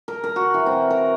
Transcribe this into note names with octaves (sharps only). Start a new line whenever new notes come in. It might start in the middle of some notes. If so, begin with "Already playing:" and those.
A#4
A#4
F#4
E3
C4
A#4